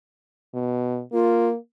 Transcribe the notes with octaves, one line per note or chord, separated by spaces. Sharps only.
B2
A#3 F4